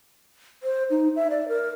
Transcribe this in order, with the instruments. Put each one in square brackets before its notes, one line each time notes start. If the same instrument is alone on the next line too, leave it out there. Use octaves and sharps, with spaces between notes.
[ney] C5
D#4
E5
D5
A#4